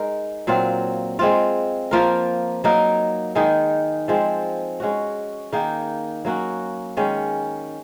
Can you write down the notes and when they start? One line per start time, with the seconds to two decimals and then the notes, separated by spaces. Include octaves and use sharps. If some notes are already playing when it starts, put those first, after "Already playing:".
Already playing: G#3 D#4 A#4
0.47 A#2 F#3 C4 F4
1.19 G#3 C4 F4
1.91 F3 A#3 F4 A#4
2.64 F#3 A#3 D#4 A#4
3.35 D#3 G#3 D#4 G#4
4.08 F3 G#3 C4
4.80 G#3 C#4 F#4
5.52 D#3 A#3 D#4 G#4
6.25 F#3 A#3 C#4 F#4
6.97 D#3 G#3 C#4